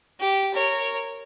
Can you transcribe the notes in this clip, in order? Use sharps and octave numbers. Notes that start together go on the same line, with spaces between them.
G4
A#4 C#5